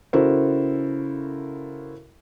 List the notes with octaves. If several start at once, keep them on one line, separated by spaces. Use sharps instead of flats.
C#3 E4 F#4 A4 A#4 C5